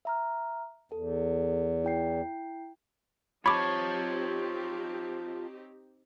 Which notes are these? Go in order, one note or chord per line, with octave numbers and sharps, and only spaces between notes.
E5 A#5 F6
E2 A4
E4 G5 C7
C4 D#4 F4 G4 C#5 A5 B5 D6